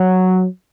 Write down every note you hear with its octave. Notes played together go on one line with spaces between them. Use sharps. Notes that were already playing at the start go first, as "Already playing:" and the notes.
Already playing: F#3